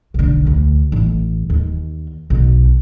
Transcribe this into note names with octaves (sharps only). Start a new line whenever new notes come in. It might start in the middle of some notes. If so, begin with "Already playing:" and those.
B1 D3
D2
A1
D#2
B1